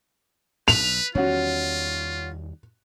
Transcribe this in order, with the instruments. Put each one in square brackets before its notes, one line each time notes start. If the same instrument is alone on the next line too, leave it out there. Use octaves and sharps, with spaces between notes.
[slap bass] B1 [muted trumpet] B4 [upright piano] F7
[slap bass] E2 D#3 G3 [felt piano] C#4 F#4 [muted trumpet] F4